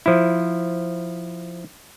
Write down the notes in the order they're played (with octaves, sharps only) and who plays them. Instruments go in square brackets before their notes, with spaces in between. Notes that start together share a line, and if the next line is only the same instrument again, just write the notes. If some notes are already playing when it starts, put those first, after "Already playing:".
[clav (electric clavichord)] F3 E4